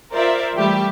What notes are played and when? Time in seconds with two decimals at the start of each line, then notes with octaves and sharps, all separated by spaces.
0.12 F4 A#4 C5 D5 E5
0.54 E3 G3 A3 G4 E5